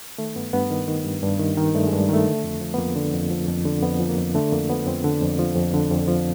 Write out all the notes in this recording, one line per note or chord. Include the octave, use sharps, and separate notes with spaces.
D#3 A3
G2 B3
G2 B3
D#3
D#3
G2
G2
D#3
D#3
G2 A3
G#3
G2
G3
D#3 A3
D3
F2
F3
B3
F2 A#3
D3
F2
F3
F2
D3
F2 B3
F3
A#3
F2
D3 A3
F2 A#3
F3 B3
F2 C4
D3
F2
F3
F2
D3
F2
F3